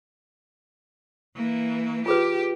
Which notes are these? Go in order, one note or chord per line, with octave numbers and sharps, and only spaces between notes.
E3 A#3
F4 G4 G#4 B4